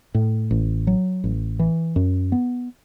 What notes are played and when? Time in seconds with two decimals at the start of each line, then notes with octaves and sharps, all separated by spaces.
0.14 A2
0.51 A1
0.87 F#3
1.24 A1
1.59 E3
1.96 F#2
2.32 B3